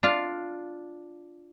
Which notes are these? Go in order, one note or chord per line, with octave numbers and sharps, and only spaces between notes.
D4 F4 F5